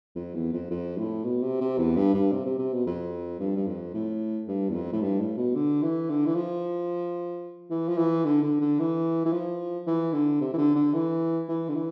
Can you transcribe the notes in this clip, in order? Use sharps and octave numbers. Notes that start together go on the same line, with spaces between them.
F2
E2
F2
F2
A2
B2
C3
C3
E2
G2
G2
C3
C3
C3
B2
F2
G2
G2
F2
A2
G2
E2
F2
A2
G2
A2
B2
D3
E3
D3
E3
F3
E3
F3
E3
D3
D3
D3
E3
E3
F3
E3
D3
C3
E3
D3
D3
E3
E3
D3
E3